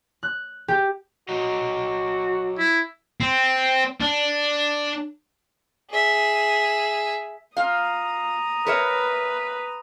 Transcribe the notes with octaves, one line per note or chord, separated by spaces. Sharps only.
F#6
G4
F#3 F#4 D#5 A#5
E4
C4
D4
G#4 E5
F4 F5 A#5 D#6
A#4 B4 C#5 E5